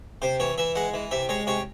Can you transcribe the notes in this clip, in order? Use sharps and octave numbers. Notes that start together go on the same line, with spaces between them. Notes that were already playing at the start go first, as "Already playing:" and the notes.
C3 C5
E3 C#5
E3 E5
G#3 F#5
E3
C3 E5
G#3 C#5
C3 C#5